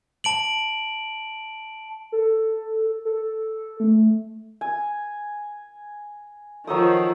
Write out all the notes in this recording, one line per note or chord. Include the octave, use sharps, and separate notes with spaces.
A5 D7 F#7
A4
A4
A3
G#5
D#3 F3 F#3 A4 D#6